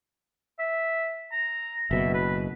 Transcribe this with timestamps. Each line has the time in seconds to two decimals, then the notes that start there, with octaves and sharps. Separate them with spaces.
0.59 E5
1.32 A#5
1.91 F#1 B2 E5
2.14 B4